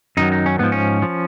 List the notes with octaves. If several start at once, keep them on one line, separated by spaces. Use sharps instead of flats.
F#2 D#3 F#3 D#4
D#4
C#4
G#2 F3 B3
C#4
F3